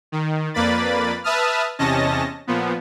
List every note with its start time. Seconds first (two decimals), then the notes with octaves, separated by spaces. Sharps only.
0.12 D#3
0.54 F2 A#3 B4 D5 B5 A6
1.24 B4 E5 A5 D#6 F6
1.79 E2 C3 C#4 D#5 A5 A#6
2.47 A#2 F3 B3